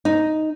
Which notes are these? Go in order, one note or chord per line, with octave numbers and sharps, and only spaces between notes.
D#4